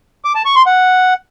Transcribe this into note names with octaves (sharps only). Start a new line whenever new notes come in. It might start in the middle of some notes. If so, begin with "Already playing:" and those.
D6
A5
C#6
C6
F#5